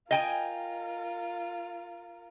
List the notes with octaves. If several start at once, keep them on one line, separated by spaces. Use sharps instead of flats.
F4 A#4 D#5 G5 G#5